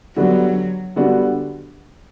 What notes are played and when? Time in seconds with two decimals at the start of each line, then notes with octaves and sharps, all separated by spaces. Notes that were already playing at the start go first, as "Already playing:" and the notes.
0.16 D3 F#3 G3 B3 D4 F#4
0.96 D3 G3 B3 D4 F#4